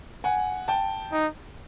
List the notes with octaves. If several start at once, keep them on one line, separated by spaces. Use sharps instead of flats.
F#5 G#5
G5 A5
D#4